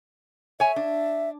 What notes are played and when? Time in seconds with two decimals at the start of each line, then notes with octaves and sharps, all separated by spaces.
0.60 C#5 E5 G#5
0.76 D4